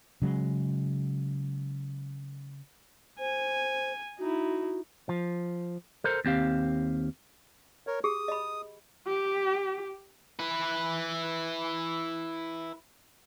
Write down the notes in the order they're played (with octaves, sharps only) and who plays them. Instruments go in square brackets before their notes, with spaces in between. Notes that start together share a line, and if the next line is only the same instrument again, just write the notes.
[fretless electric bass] C#3 F#3 G#3
[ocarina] C5 [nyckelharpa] G#5
[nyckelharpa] D#4 E4 [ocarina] F#4
[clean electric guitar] F3
A4 A#4 C5
D#2 C4 G4 F5
[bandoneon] A#4 C#5
[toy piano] G4 G#4 [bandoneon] D#6
[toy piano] D#5 B5
[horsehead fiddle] G4
[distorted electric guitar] E4 B4